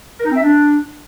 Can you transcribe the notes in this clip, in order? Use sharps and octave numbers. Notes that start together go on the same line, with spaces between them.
A#4
D#4
C4
E5
D4